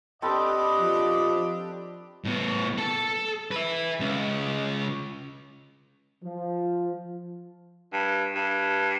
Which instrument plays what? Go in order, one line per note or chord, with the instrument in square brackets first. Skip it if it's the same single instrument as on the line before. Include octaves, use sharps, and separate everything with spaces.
[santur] C4 A4 B4 [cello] D4 G4 [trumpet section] D#5
[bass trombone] F3
[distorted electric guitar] A2 B3
A4 A5
B4 E5
C#2
[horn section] F3
[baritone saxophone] G2
G2